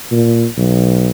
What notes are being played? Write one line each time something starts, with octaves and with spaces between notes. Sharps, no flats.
A#2
B1